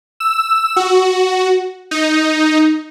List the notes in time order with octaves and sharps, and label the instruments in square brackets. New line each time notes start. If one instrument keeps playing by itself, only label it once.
[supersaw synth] E6
F#4
D#4